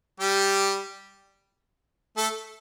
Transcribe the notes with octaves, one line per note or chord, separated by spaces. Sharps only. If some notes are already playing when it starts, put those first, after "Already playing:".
G3 G4
A3 A4